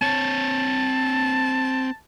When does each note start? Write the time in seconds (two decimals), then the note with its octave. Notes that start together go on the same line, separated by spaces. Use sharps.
0.02 C4 C#5 A5